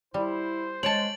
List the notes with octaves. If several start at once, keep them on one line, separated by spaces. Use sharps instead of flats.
G3 E4 C5
G#3 C#5 A5 A6 D7 F#7